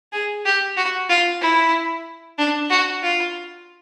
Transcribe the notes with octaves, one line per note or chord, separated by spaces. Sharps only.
G#4
G4
F#4
F4
E4
D4
F#4
F4